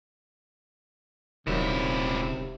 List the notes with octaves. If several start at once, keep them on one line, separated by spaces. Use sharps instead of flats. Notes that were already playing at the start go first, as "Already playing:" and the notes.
D#1 C#2 C3 D#3 F#3 G3 E4